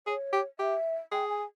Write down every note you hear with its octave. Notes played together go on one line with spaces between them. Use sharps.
G#4 C#5
G4
G4 E5
G#4 G5
G#5